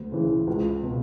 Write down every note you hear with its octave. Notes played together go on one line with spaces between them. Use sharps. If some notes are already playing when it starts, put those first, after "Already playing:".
Already playing: D2
C#3 E3
C#2
B2